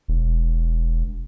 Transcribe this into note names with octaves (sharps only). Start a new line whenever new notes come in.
E1